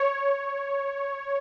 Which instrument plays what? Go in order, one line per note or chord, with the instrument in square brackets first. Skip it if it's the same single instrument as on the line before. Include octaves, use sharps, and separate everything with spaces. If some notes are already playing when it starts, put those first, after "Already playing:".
Already playing: [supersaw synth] C#5